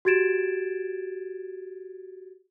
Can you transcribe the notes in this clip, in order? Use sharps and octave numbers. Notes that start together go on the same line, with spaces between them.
F#4 G4 G#6 A6 D7 E7